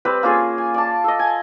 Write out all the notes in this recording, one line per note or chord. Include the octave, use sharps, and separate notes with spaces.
G3 C4 B4
A#3 C#4 F4 G#4
G#5
D5 A5
A4 D#5
G#5